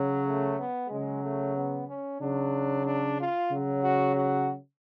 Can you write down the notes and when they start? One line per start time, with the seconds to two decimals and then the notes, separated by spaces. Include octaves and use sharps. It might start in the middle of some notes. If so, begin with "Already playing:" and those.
Already playing: C#3 F#3
0.24 A3
0.57 B3
0.89 C#3 F#3 G#3
1.22 A3
1.54 B3
1.87 C#4
2.19 C#3 F#3 D4
2.85 D4
3.17 F4
3.50 C#3 F#3
3.81 F#4
4.14 F#4